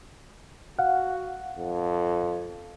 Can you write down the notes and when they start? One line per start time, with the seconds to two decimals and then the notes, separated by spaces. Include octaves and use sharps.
0.79 F#4 F5 F#5
1.58 F2